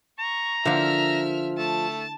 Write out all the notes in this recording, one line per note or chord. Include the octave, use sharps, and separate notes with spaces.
A#5 C#6
D3 F3 A#3 E5 F6
A3 A5